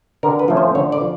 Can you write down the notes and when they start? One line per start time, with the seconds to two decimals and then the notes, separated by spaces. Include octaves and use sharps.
0.23 D3 A#4
0.39 B4
0.48 F3 A3 C#4
0.57 C5
0.75 D3 C#5
0.92 D5
1.01 F3